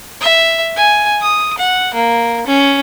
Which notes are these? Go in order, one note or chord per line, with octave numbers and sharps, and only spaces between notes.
E5
G#5
D#6
F#5
A#3
C#4